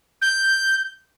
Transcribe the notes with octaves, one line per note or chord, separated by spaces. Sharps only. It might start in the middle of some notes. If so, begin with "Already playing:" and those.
G6